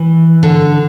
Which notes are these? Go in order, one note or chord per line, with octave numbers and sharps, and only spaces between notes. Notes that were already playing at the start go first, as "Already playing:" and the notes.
Already playing: E3
D3